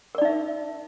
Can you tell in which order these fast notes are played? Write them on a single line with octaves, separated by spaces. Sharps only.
A#4 D5 D#4 E5